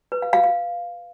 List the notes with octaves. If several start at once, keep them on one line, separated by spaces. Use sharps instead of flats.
B4
F5
F5
F5